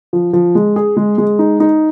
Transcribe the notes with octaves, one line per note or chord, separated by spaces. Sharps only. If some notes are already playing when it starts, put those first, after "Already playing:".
F3
F3
G#3
G#4
G#3
G#3
D#4
D#4